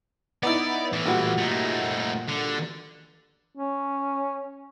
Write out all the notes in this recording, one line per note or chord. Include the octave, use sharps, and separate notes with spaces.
B3 D#4 E4 D5
A2 E3
A#2 G3 F#4
A3 D#4
D3
C#4